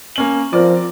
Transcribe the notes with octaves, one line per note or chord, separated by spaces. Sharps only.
A#3 C#4 F#7
F3 C4 A#4 D5